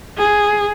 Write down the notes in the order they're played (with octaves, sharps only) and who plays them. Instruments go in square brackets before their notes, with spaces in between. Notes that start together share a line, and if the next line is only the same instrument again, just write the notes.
[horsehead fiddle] G#4